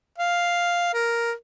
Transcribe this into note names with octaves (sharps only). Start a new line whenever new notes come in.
F5
A#4